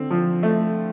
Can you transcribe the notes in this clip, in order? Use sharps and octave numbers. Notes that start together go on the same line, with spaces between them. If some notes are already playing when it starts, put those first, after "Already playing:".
Already playing: D3 C4
F3
A3